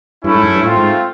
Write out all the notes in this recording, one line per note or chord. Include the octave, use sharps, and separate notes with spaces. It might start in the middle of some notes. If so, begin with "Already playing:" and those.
G2 A3 C#4 E4
G#2
F#2
G2
A2 A3 C4 F4
G#2